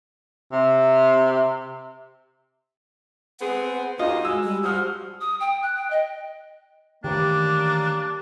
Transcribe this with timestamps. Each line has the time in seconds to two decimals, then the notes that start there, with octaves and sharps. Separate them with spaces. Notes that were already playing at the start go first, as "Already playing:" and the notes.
0.52 C3
3.41 B3 C4 G#4 F#5
3.99 D#2 F4 F#4 D#5
4.25 G#3 E6
4.43 G3
4.64 F3 G3 F#4 D#6 F6
5.21 D#6
5.40 G5
5.63 F#6
5.76 G5
5.91 D#5
7.04 D#3 E3 G3 A3 A#3 D4 C#5